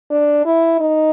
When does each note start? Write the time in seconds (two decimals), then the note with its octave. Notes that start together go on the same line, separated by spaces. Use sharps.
0.10 D4
0.46 E4
0.80 D#4